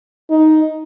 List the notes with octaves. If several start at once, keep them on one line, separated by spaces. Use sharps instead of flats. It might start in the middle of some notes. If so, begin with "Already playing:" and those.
D#4